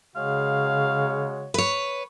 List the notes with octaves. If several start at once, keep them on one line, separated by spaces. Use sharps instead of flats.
C#3 G#3 F#4 C#5 F5
B4 C#5